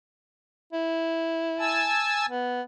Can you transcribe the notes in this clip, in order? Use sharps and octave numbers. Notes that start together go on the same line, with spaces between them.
E4
G#5 A5 E6
B3